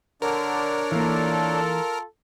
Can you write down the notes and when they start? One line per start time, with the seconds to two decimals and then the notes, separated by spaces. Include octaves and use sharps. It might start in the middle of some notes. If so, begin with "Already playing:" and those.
0.22 D3 D4 A#4 C#5 D5
0.92 E3 A#3 F4 A4